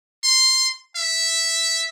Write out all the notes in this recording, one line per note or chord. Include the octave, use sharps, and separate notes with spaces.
C6
E5